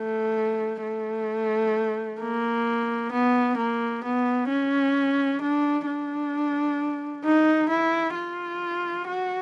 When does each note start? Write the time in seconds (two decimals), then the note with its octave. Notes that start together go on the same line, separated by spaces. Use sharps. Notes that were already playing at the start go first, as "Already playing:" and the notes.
Already playing: A3
0.83 A3
2.21 A#3
3.12 B3
3.57 A#3
4.04 B3
4.49 C#4
5.41 D4
5.86 D4
7.24 D#4
7.69 E4
8.14 F4
9.06 F#4